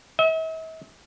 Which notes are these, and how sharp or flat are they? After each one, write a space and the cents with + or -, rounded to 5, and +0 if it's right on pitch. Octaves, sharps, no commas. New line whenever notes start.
E5 -45